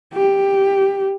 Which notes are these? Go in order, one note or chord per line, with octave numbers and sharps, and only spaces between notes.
G4